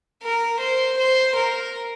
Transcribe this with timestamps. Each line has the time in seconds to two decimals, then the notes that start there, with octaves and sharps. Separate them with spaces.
0.23 A#4
0.60 C5
0.98 C5
1.36 A#4